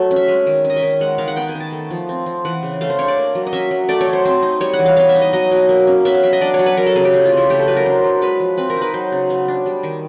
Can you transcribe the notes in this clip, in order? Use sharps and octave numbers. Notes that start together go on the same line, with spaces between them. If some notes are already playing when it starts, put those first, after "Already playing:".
Already playing: F#3 A3
C#4
E5
G#3
D#3
C#4
D#5
E5
D#3
G#3 F#5
D#3 F5
F#5
B3 G5
G#5
D#3
A5
A3
F3
C4
F3
E3 F#5
C#3
A3 F5
C5
D4 C#5
D5
A#3
F#3
D#5
C#4 E5
F#3
A3 D5
C#5
F#3
C5
C4 C5
D#4
G3 C#5
F#5
E3
F5
B3 F5
E5
D#4
D#5
F#3 D#5
B2
A#3
C#4
B3 E5
F5
F#3 E5
D#5
D4 D5
C#5
F#3
B4
F#3 A#4
A4
C#3 G#4
G4
A3
F4
C#3
E4
A3 G4
A4
F#3 B4
A#4
D4 C5
F#3
G#3 B4
F3
C4 B4
A#4
D#4
B4
F#3 C5
C#3
B3
D4
G3
D#3